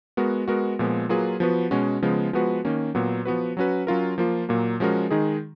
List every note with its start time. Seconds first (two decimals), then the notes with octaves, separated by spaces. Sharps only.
0.17 G#3 B3 F#4 A#4
0.48 G#3 B3 F#4 A#4
0.79 A#2 F3 G#3 B3
1.09 F#3 A#3 F4 G#4 B4
1.40 F3 B3 F#4 B4
1.71 B2 G#3 C#4 F#4
2.02 C#3 F3 G#3 B3
2.33 F3 G#3 B3 F#4 B4
2.65 D#3 A#3 C#4
2.95 A#2 F#3 B3
3.25 F3 B3 F#4 B4
3.57 F#3 C#4 F#4 B4
3.87 F#3 C#4 F4 A#4
4.18 F3 A#3 F4
4.49 A#2 F#3 A#3
4.80 F3 G#3 C#4 F#4 A#4
5.11 D#3 G#3 D#4 G#4